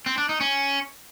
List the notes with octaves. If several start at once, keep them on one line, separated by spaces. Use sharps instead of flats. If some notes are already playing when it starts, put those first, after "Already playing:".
C4
D4
D#4
C#4